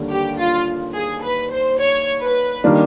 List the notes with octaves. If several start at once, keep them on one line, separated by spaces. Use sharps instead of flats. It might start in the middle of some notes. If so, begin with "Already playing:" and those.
Already playing: D#2 D3 G3 A#3 D4
G4
F4
G#4
B4
C5
C#5
B4
D#3 G3 A#3 D4